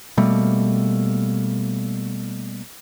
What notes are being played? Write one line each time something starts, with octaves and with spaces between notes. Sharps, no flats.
B2 G3 A3 A#3